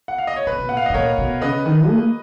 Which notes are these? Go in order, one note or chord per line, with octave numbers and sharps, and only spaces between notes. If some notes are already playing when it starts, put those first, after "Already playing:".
F#5
F5
D#5
C#5
B2 B4
B2
A#2 F#5
F5
D#5
G#2
A#2 A#4 C#5
B2
C#3 B4 D#5
D#3
A#3